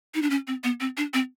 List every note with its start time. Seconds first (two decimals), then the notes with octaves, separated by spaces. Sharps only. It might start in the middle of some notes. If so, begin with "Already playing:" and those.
0.15 D#4
0.22 D4
0.30 C#4
0.47 C4
0.64 B3
0.80 C4
0.97 D4
1.14 C4